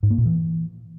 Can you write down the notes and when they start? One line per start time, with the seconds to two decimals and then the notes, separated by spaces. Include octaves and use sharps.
0.03 G#2
0.10 A#3
0.18 A#2
0.26 E3